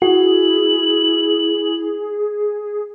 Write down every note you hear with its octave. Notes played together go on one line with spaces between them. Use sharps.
E4 F#4 G#4 F#7